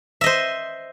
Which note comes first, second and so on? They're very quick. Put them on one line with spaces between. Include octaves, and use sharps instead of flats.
E5 D#5 C5